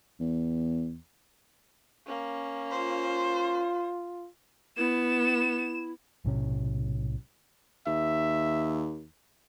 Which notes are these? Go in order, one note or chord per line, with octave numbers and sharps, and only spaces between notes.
E2
A#3 C#4
F4 C5
B3 E4 E7
B1 A2 C3 C#4
D#2 E5